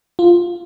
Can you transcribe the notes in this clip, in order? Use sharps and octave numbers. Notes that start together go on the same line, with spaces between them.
F4